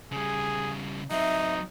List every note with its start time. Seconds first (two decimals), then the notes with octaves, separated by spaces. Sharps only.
0.12 C#3 G3 G#4
1.11 F#3 C4 D#4 E5